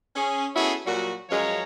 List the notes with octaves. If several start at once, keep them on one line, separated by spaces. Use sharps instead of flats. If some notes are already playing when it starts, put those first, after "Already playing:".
C#4 G#4
B3 C#4 E4 F#4 G#4 A4
A#2 F#3 G3 F#4
F#2 F3 G#3 C#4 C#5 A#5